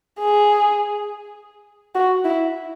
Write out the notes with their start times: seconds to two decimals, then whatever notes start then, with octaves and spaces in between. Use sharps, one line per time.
0.20 G#4
1.95 F#4
2.25 E4